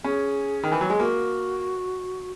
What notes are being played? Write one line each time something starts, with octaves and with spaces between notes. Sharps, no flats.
C#4 G#4
D#3
E3
F#3
G#3
A#3 F#4